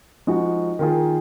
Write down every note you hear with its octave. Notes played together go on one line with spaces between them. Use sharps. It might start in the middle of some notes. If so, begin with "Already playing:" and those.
F3 G#3 D#4 F#4
D#3 A#3 F4 G#4